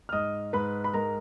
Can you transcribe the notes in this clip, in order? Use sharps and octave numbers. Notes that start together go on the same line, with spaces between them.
F6
G#2 D#5 D#6
G#2 B4 B5
B5
G#3 A#4 A#5